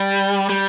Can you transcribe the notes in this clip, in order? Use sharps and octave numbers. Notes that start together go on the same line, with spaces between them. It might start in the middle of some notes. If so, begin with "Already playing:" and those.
Already playing: G3
G3